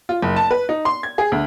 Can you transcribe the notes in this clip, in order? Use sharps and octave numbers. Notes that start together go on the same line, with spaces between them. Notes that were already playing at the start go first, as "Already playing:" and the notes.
F4
F#1
A5
B4
D#4
C6
G#6
G#4
D2